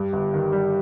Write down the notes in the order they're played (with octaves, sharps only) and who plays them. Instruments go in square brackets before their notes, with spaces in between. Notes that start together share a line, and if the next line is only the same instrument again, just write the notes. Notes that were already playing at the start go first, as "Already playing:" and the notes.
Already playing: [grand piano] G2 [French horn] G4
[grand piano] G1
D#3
G3